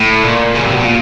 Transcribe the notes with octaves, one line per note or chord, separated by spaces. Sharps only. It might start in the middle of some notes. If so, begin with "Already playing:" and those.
Already playing: A2
A#2
C#3
C3
B2
A#2